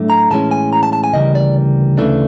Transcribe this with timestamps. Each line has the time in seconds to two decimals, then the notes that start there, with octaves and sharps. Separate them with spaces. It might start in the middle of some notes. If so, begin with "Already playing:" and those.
Already playing: A2 F#3 A3 D4
0.10 A#5
0.31 A2 E3 G#3 C#4 E4 A5
0.51 G#5
0.73 A#5
0.83 A5
0.93 A5
1.04 G#5
1.13 D2 C#3 E3 G3 A#3 D#5
1.35 D5
1.98 D2 C#3 E3 A3 D4